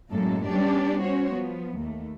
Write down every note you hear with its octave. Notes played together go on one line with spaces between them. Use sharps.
F#2 A2 F#3 G#3 A#3 A4
G3 B3 C#4 D4 G4 D5
C#4 F#4 C5 C#5
F3 B3
D#2 A3